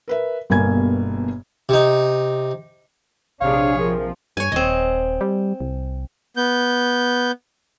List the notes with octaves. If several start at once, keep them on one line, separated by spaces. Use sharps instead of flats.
A#4 B4 E5
G1 G2 B2 A#3 G#5 G#6
C3 D#4
A#1 C3 D4 G#4 C#5 F5
F3 A#4
G2 C#5 G#5
D#1 C4 D#5
G3
C2
B3 G6